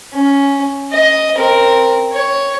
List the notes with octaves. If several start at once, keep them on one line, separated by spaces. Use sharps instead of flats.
C#4
D#5
C4 A#4
C#5